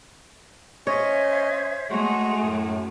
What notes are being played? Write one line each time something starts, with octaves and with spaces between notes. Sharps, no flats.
C#4 C5 C#5 D#5 E5 G#6
G#3 A3 F#4 G#4 A#5 C6
F#2 A2